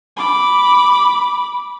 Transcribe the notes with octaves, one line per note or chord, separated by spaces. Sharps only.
B5 D6